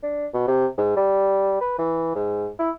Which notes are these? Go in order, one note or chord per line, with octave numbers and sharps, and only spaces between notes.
D4
B2
C3
G#2
G3
B4
E3
G#2
E4